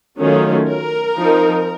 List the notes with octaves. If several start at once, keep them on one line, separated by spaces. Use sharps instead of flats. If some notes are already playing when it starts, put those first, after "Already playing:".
D#3 F#3 A3 C#4 F4
A#4
F3 C4 D#4